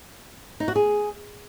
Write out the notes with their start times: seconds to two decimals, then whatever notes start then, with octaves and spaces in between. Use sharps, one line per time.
0.60 D#4
0.68 F#4
0.76 G#4